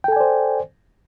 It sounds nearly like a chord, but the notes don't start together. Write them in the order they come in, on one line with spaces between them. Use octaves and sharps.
G5 A4 G#5 D5 C5